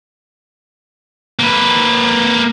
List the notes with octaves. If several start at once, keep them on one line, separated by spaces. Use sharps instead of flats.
A#3 B4